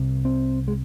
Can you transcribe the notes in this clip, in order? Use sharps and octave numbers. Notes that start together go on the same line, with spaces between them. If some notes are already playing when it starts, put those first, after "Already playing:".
Already playing: C2 C3
C4
G#3